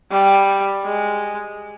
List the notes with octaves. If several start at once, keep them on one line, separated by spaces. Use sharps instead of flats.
G3
G#3